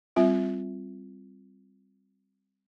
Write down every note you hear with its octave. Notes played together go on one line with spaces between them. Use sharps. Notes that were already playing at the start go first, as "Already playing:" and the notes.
G3 C4 F4 E5